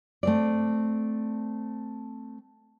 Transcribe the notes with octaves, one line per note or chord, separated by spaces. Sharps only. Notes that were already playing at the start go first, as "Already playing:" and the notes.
A3 C4 D5